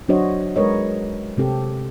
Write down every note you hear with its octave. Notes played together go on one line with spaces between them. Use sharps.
F#3 D4 F#4 C5 C#5 D#5
G#3 A#4 B4 C#5 D#5
C3 C4 G4 A4